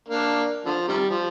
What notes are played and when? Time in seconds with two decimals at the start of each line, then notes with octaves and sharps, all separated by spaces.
0.09 A#3 D4
0.65 D3 F3
0.88 C3 D#3 G3
1.10 F3